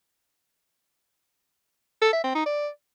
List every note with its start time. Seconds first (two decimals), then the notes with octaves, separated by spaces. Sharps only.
2.02 A4
2.13 E5
2.24 C4
2.35 D#4
2.46 D5